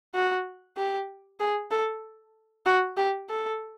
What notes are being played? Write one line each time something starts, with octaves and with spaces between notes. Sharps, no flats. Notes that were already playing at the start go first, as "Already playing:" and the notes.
F#4
G4
G#4
A4
F#4
G4
A4